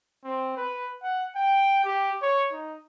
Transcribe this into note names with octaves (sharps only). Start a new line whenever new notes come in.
C4
B4
F#5
G5
G4
C#5
D#4